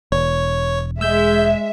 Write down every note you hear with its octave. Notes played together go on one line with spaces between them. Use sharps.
E1 C#5
G#3 E5 E6 G6